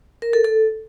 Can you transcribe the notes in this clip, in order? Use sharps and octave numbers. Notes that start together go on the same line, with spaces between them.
A#4
A4
A4